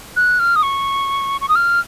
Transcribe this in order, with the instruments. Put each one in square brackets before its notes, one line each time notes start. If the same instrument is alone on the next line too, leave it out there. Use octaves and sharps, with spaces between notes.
[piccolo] F#6
F6
D#6
C#6
C#6
D#6
F6